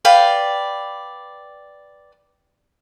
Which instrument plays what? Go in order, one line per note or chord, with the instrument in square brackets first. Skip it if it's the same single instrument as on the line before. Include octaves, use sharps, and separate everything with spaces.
[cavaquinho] B4 D5 F5 G5